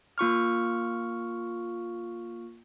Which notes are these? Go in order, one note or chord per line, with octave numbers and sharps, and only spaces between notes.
A#3 F4 C#6 F6